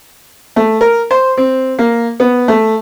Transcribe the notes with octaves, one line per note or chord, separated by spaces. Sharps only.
A3
A#4
C5
C4
A#3
B3
A3